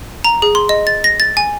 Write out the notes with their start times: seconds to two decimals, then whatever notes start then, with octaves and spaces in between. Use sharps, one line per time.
0.24 A#5
0.42 G#4
0.55 C6
0.69 D#5
0.87 A6
1.04 A#6
1.20 A6
1.37 G#5